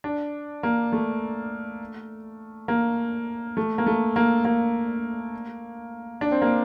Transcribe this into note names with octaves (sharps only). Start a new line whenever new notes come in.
D4
A#3
A3
A#3
A3
A#3
A3
A#3
A#3
D4
C4
A#3